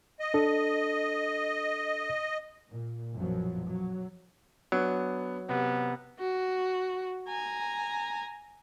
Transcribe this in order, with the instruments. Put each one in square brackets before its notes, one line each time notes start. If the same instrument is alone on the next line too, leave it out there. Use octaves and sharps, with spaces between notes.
[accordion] D#5
[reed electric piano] D4 A4
[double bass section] A#2
A#1 F#2 B2 F3 F#3
F#3
[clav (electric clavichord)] F#3 [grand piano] B3 D4
[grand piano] C3 [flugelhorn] B3
[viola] F#4
G#5 A#5